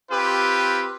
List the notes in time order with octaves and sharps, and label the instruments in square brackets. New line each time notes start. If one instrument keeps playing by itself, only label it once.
[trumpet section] C4 F4 G4 B4